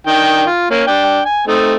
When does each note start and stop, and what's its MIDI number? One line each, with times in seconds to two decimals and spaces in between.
0.07 0.45 51
0.07 0.45 62
0.07 0.45 79
0.46 0.70 65
0.70 0.83 58
0.70 0.83 61
0.87 1.20 62
0.87 1.20 79
1.25 1.44 80
1.47 1.75 57
1.47 1.75 60
1.47 1.75 63